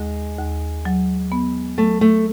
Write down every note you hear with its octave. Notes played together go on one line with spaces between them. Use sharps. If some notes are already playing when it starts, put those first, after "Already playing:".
Already playing: D#2 G#3
D#2
F#3
B3
F#3 A3
A3